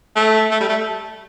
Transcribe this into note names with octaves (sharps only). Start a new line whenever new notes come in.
A3
A3
G3
A3